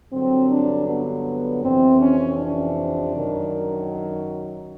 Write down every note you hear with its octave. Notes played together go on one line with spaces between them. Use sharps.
G2 D3 F#3 C4
D4
B3
F2 C3 E3 C4
C#4
D4
F#2 D#3 F#3